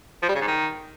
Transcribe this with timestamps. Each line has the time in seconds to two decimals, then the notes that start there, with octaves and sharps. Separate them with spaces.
0.23 F3
0.29 G3
0.35 C#3
0.41 G#2
0.48 D#3